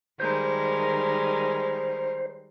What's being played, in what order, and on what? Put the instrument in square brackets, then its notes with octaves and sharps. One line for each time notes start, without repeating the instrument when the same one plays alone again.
[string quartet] D#3 A#4 [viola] G3 G#3 [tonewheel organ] C5